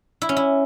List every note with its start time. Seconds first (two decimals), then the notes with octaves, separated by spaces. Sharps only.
0.22 E4
0.29 C#4
0.37 E4